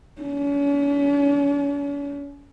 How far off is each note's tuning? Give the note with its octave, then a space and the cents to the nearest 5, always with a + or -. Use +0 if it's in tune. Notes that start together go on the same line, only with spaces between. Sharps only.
C#4 +40